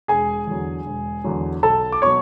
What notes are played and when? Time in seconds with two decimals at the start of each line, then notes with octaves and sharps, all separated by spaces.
0.08 E1 G#4 G#5
0.47 E2 D3 F#3
0.86 E1
1.24 E2 D3 F#3
1.63 B1 A4 A5
1.92 D6
2.02 B2 F#3 C#5 C#6